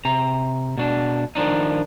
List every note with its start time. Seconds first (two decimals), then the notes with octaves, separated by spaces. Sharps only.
0.05 C3 A#5
0.78 B2 D4
1.35 D#3 F3 D4 D#4